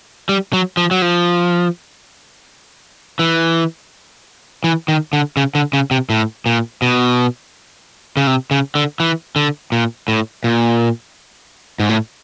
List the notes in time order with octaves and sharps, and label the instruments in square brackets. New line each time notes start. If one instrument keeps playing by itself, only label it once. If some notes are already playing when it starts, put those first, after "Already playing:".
[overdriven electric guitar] G3
F#3
F3
F#3
F3
E3
E3
D#3
D3
C#3
D3
C#3
C3
A2
A#2
B2
C#3
C3
C#3
D3
E3
D3
A#2
A2
A#2
G#2
A2